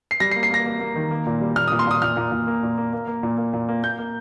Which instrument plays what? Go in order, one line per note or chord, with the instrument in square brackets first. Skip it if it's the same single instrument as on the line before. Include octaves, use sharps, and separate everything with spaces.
[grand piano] C7
G3 A#6
C7
A#3
C7
A#3 A#6
A#3
A#3
D#3
A#3
A#2
G3
A#2 F6
D#6
A#2
C6
A#2 D#6
A#2 F6
A#2
A#2
A#3
A#2
A#3
A#3
A#3
A#2
A#3
A#2
A#3
A#3 G6
A#3